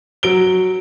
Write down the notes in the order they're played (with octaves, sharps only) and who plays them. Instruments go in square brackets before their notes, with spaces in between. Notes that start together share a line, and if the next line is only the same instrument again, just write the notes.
[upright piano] F#3 D7 G7